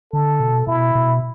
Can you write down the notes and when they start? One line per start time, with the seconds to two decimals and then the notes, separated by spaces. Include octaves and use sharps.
0.13 D3 A4
0.40 B2
0.67 B2 E4
0.95 B2